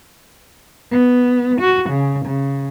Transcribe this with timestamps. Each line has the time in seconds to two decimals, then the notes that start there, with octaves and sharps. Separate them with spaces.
0.91 B3
1.60 F#4
1.90 C#3
2.25 C#3